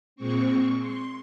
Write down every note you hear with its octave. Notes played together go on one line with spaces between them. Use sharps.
A#2 G#3 C4 C#6
C6